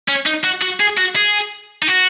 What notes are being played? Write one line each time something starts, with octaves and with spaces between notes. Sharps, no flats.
C#4
D#4
F#4
F#4
G#4
F#4
G#4
D#4
F#4